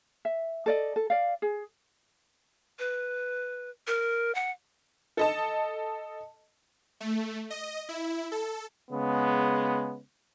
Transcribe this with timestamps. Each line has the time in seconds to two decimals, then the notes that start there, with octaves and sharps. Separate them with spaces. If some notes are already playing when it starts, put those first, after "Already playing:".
0.25 E5
0.66 A4 D5 D#5
0.96 A4
1.10 D5 F5
1.42 G#4
2.79 B4
3.87 A#4
4.35 F#5
5.17 A4 D#5 A5
7.00 A3
7.50 D#5
7.89 E4
8.32 A4
8.91 C#3 G#3 B3